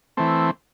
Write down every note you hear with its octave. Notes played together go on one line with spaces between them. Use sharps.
E3 A3 C4